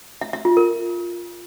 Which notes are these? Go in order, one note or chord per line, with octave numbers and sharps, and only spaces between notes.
E5
E5
F4
A#4